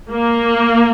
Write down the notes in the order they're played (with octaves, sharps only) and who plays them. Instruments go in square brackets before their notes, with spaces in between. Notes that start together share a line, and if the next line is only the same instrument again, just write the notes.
[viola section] A#3